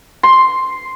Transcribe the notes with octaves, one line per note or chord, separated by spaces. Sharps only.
C6